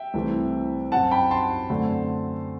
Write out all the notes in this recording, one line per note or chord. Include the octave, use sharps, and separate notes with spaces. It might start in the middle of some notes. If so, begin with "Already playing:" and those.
Already playing: E5 G5
C2 C3 E3 A3 C4
F#2 F#3 C4 F#5 A5
G5 B5
A5 C6
F#2 D3 A3 C4